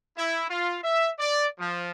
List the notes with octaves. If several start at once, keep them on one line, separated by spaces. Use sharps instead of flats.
E4
F4
E5
D5
F3